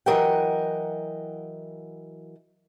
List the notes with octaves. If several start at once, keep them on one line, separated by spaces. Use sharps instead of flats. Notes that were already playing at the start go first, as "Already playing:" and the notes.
E3 F#3 A#4 D#5 F#5 G5